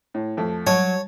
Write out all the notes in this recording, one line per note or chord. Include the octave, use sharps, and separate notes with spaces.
A2
F2 A3
F#3 C#5 A5